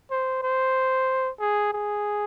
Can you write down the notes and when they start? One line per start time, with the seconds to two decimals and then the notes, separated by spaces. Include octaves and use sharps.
0.11 C5
0.43 C5
1.40 G#4
1.73 G#4